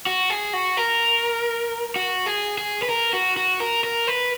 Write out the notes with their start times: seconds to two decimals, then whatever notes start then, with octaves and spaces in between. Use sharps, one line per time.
0.06 F#4
0.30 G#4
0.53 F#4
0.77 A#4
1.96 F#4
2.26 G#4
2.58 G#4
2.82 B4
2.89 A#4
3.13 F#4
3.37 F#4
3.60 A#4
3.84 A#4
4.07 B4